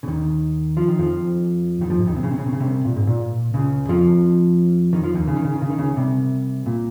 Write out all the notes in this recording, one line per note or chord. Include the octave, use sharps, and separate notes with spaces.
C#3
D#2 D#3
F3
D#3
F2 F3
D#2 D#3
F2 F3
G#2
D#2 D#3
C3
C#3
C3
C#3
C3
C#3
C2 C3
A#2
G#2
A#2
C#2 C#3
F2 F3
D#3
F3
D#2 D#3
C#3
D#3
C#3
D#3
C#3
D#3
C#2 C#3
C2 C3
A#2